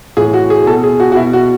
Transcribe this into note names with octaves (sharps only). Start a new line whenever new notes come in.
A2 E3 G#4
F#4
G#4
B2 A4
G#4
F#4
F#4
B2 E4
F#4